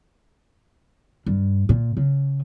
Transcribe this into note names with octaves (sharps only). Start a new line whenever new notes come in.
G2
A#2
C#3